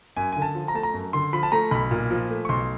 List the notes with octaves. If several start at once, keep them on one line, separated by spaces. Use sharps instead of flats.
F#2 G#5
D3 G#5
A5
F3
A#5
A3 A5
A#5
F#2
D3 C6
F3 B5
A5
A3 A#5
B1 B5
A#2
F3
A3
C#6
B1 C6